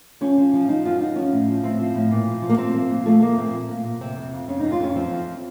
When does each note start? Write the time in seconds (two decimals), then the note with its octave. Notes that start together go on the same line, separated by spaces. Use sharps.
0.21 F3 C#4
0.38 F3
0.53 F3
0.69 F3 D#4
0.85 F#2 F4
1.01 F#2 D#4
1.16 F3 C#4
1.32 A2
1.48 F3
1.63 A2 C4
1.79 F3
1.95 A2
2.11 A#2
2.27 F3
2.42 F3
2.49 A#3
2.58 F3 C4
2.75 F3
2.90 A#2
3.06 F3 A3
3.21 F3 A#3
3.38 A#2 C4
3.53 F3
3.69 A#2
3.84 A#2
4.01 C3 C4
4.16 F2
4.33 F2
4.48 F2 C#4
4.60 F2 D#4
4.72 F4
4.80 F2 C#4
4.96 F3 C4
5.11 F2